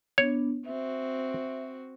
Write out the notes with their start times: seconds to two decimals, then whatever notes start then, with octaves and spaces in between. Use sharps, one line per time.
0.18 B3 D4 C#5
0.66 C4 F#4 E5